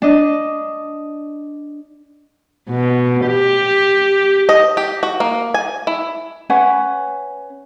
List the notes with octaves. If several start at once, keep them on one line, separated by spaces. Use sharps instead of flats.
D4 D#5
B2
G4
D#5
G4
F#4
A#3
G#5
E4
C#4 B4 F#5 G#5